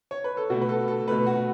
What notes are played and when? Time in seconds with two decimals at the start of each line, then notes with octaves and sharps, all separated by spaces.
0.11 C#5
0.24 B4
0.37 A4
0.50 B2 A3 F#4
0.61 B4
0.69 A4
0.88 A4
1.08 B2 A3 B4
1.27 F#4